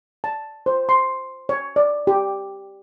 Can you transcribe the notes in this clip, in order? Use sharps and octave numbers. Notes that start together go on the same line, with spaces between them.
A5
C5
C6
C#5
D5
G4